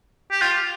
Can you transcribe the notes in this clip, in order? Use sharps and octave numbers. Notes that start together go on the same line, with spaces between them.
G4
F4